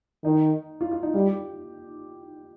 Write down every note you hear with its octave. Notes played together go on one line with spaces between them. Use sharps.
D#3 D#4
F4
F4
D#4
G3 F4
G4